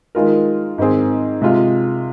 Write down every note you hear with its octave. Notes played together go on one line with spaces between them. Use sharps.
D#3 G#3 F4 A#4
G#2 D#3 C4 G#4
C3 G#3 F4